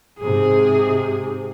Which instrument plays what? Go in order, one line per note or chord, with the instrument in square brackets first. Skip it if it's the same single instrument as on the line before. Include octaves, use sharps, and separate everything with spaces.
[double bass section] G#2 C3 [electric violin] G#4